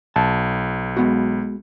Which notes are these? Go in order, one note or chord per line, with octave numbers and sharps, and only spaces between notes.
B1 A5
G#3 B3 F#4